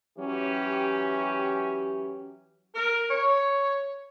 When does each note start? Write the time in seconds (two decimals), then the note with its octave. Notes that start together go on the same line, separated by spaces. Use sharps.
0.18 E3 F#3 C#4 G4
2.75 A#4
3.09 C#5